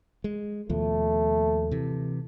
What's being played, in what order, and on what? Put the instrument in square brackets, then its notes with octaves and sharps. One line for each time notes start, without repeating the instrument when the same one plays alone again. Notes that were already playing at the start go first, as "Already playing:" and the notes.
[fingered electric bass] G#3
[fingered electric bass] D#2 B2 F3 [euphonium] A3
[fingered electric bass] C3 E3